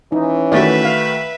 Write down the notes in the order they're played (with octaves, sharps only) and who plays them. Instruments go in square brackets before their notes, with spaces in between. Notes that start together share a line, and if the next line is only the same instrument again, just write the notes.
[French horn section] E3 C#4 [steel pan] D#4
[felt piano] D#3 A3 F#4 [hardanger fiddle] B4 E5 [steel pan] D5
[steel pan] F5